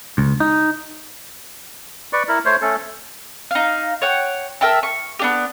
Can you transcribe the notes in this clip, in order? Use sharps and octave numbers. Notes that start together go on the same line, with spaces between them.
C#2
D#4
B4 D5 C#6
E4 A#4
A3 C5 C#5
A3 C#4 A4
D#4 F5
C#5 F#5 G5
A#4 E5 G5 A5
C#6
B3 D4 G4